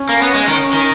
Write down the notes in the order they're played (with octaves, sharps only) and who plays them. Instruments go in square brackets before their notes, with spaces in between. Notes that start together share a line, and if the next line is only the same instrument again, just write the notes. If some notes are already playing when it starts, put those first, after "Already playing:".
Already playing: [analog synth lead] C#4
[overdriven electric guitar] A#3
B3
G#3
D#3
D#3